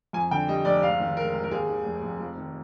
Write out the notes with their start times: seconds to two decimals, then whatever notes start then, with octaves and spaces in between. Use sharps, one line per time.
0.13 F2 G#5
0.31 D3 G5
0.48 G3 D#5
0.65 F1 D5
0.82 G#2 F5
1.00 D#3
1.17 G#3 A#4
1.34 G#1
1.44 A#4
1.51 D#2 G#4
1.69 D#3
1.86 F1
2.03 F1
2.20 F2
2.37 D#3